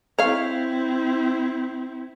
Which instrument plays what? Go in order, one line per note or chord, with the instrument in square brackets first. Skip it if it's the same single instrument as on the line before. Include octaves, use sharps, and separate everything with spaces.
[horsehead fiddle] C4 E4 [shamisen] C#5 F5